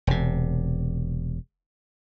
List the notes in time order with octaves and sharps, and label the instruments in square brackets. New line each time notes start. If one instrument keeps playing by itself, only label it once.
[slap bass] E1 C3